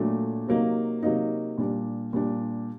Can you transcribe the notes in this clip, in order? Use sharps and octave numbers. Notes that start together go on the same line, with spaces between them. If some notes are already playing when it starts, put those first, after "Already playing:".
Already playing: A#2 F#3 A3 D4
C3 F#3 A#3 D#4
C3 F#3 A#3 D#4
A#2 G3 D4
A#2 G3 D4